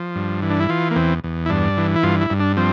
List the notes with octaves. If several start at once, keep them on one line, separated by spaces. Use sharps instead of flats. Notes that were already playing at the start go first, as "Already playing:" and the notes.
Already playing: F3
G2
E3
D4
E4
E3 F4
A#3
E2 C4
E2
E4
G2 D4
E3
E4
G2 F4
E4
G2
D4
F3 C4